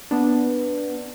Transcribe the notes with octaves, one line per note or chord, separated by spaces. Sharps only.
B3 D4